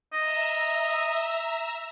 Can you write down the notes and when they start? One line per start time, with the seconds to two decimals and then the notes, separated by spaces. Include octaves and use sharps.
0.13 D#5 E5 A#5 E6